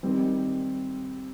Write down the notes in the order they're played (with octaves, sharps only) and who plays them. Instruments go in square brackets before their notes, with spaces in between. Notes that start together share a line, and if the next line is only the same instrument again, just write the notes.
[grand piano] D#3 G3 C4